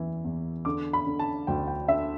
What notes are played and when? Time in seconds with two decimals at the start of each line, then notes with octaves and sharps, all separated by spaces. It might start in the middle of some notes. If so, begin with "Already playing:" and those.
Already playing: E2 E3
0.24 E2
0.65 D3 D6
0.93 B5
1.07 D3
1.19 A5
1.47 D2 G5
1.68 G5
1.88 D3 E5